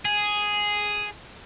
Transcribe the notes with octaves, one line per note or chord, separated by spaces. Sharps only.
G#4